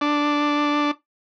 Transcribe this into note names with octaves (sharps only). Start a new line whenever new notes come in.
D4